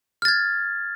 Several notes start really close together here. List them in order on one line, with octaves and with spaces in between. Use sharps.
F6 A6 G#6